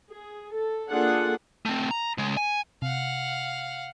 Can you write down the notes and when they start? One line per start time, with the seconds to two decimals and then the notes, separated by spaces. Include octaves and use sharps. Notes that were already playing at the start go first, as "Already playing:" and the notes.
0.12 G#4
0.53 A4
0.90 A#3 D4 F4 G#4 A4 F#5
1.65 A3 C4
1.91 A#5
2.18 C#3 G#3
2.37 G#5
2.82 C3 F5 F#5